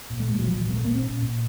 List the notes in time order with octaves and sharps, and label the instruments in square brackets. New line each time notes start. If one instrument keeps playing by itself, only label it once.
[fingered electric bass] A#2
A3
A#2 G#3
F#3
A#2 F3
F#3
A#2 A#3
A3
A#2 A#3
C4
A#2 C#4
A#2